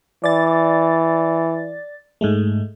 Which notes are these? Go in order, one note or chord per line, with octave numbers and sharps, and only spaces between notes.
E3 D5 A6
G#2 G#3 A3